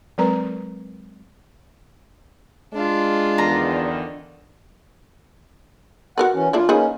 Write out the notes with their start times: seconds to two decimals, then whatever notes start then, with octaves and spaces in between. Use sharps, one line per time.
0.18 F#3 G#3 C4 A#4 B4 A#5
2.74 G#3 D4 F4
3.38 E2 D3 D#3 A#5
6.18 F#4 A#4 B4 F#5
6.34 E3 C#4
6.53 A#3 D4 E4 F4
6.69 A#3 C#4 D#4 G#4 B4